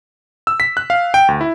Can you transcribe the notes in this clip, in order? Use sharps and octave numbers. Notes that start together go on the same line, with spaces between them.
E6
B6
F#6
F5
G5
D2
E4